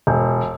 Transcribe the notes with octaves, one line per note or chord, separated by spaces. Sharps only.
E1